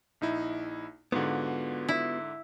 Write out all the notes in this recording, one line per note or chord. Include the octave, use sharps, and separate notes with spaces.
A#1 D#4 E4
G#2 D3 B3 F4 F#4
E4